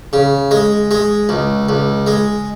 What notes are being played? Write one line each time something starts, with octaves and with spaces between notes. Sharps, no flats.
C#3
G#3
G#3
C#2
C#2
G#3